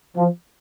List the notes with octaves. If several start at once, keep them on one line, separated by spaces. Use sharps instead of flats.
F3